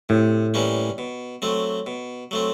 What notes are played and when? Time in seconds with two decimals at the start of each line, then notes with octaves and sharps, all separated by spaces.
0.09 A2 C3
0.54 E3 G3 A#3 C#4
0.98 B2
1.42 F#3 A3 C4
1.87 B2
2.31 F#3 A3 C4